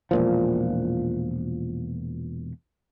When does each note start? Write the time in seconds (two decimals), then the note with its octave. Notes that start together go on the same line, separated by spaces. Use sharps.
0.11 E1 A#2 F3